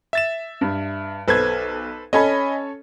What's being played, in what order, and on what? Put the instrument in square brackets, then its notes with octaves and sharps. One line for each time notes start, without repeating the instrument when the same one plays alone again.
[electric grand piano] E5 A6 E7
[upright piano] G2
[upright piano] B1 G#6 [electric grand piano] A4 B4 C5
[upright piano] C#4 A4 C#5 [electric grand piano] D#5 G#5 B5